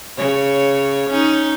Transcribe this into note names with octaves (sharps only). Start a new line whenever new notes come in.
C#3 C#5
C#4 D#4